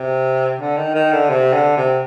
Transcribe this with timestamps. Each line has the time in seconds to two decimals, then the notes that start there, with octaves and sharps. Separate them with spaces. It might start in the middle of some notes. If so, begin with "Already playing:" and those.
Already playing: C3
0.60 D3
0.77 D#3
0.95 D#3
1.12 D3
1.30 C3
1.53 D3
1.77 C3